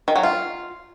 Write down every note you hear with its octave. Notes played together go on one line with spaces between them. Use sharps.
D#3
F#3
F4